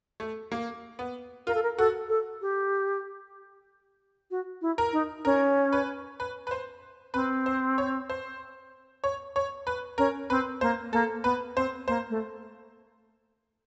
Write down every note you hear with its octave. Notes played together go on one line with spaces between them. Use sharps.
A3
A#3
B3
F4 A#4
A4
A#4
F#4 A4
A4
G4
F#4
E4
A#4
D#4
C#4 A#4
B4
B4
B4
C5
C4 B4
C5
C#5
C5
C#5
C#5
B4
C#4 A#4
C4 B4
A#3 C5
A#3 A4
B3 B4
C4 C5
A#3 C5
A3